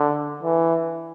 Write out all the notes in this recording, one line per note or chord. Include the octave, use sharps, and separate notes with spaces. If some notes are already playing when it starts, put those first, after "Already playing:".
Already playing: D3
E3